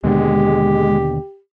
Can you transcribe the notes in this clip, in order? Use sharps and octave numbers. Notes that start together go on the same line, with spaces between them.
D#2 B2 D3 G#3 G4